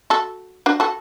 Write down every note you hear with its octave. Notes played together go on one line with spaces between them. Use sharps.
F#4 A4
D4 F#4
F#4 A4